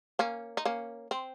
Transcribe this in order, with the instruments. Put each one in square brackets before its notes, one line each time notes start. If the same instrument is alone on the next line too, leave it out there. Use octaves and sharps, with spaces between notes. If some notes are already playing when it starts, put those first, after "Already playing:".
[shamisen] A#3 C#4
D#4
A#3 C#4
C4